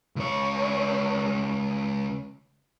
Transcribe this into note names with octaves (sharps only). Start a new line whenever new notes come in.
C#2 C#5